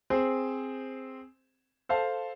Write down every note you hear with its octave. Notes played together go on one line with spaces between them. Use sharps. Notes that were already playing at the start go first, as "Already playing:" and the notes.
C4 G#4 C5
A4 C5 F5 A5